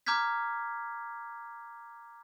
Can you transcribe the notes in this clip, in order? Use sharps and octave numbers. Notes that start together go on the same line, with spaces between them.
A#5 D6 F6 G6 G#6 B6